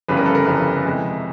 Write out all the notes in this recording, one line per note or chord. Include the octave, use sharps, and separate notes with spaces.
G1 F2 C#3 E3 G3 B4
A#4
A4
A#4
G1 F2 C#3 E3 G3
F2 C3 E3 G#3